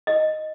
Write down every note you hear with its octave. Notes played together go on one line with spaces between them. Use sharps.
D#5